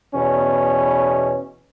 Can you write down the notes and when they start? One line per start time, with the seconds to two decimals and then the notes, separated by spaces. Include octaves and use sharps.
0.15 E2 B2 C#4